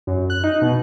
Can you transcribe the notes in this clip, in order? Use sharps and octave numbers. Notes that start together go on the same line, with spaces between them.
F#2
F#6
D#4
B2